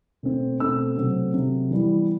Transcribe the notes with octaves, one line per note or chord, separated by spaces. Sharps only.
B2 A3 C4
B2 A3 C4 E6
C3 F#3 A3 C4
C3 F#3 A3 C4
E3 G3 B3